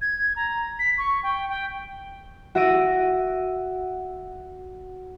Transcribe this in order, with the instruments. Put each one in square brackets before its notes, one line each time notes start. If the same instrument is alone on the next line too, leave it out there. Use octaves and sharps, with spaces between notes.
[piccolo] G#6
A#5
B6
C#6
G5
G5
[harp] F#4 E5 A#6 D7 D#7